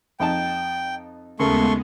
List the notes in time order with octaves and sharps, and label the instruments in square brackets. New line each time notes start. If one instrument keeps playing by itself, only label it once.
[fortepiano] F2 D#4 A5 [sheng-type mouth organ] G5
[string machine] D#2 G#3 B3 [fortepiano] C#3 A#4 [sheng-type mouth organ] A3 C6 C#6